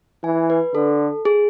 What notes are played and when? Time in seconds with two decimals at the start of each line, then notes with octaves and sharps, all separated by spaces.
0.24 E3 G#5
0.50 B4
0.74 D3 A4
1.25 G#4